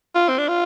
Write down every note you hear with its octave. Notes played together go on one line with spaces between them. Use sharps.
F4
C4
D4
F4